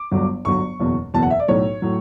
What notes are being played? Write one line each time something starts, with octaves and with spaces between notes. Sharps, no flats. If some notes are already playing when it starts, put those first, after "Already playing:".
Already playing: D6
G1 G2 F#3
G1 G2 F#3 C#6
F#1 E2 B2
F#1 E2 B2 A5
F#5
E5
D5
B1 A2 F#3 C#5
A2 F#3